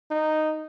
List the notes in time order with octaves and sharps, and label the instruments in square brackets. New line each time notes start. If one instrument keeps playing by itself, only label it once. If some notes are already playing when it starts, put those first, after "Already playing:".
[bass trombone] D#4